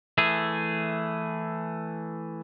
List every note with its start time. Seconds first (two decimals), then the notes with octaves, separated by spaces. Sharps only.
0.18 E3 A3 G#4